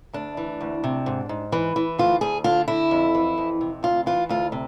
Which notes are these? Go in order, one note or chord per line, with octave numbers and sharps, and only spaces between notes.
D2 D4
E3
D2
C3
G#2
G#2
E3
E3
D2 F4
D2 G#4
D3 F4
D3 E4
F2
E3
F2
C3
D2 F4
E3 F4
D2 F4
C3